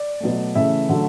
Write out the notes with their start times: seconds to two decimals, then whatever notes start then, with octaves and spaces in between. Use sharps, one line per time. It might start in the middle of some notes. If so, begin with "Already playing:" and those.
Already playing: D5
0.20 B2 F#3 A3
0.55 C#3 E3 A3 E5
0.89 D3 F#3 A3